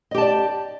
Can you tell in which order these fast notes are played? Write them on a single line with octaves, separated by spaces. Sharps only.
D#5 G4 A5 D5